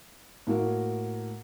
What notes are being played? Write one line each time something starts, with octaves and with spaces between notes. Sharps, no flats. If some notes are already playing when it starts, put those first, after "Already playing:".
A2 A#3 F#4 A#4